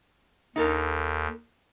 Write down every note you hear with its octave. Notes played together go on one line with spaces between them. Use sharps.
D#2 D#4 A4 A#4